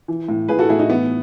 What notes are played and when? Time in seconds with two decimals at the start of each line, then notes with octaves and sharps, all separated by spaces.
0.08 E3
0.28 A2
0.48 A2 G#4 B4
0.59 F#4 A4
0.69 A2 E4 G#4
0.79 D#4 F#4
0.89 E3 B3